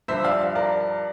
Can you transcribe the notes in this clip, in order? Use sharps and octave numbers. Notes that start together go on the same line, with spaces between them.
G2 F3 C5 E5
D5 F5
A#4 D5